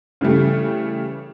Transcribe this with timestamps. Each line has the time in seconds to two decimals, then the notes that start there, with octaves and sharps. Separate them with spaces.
0.21 C#3 E3 G3 A3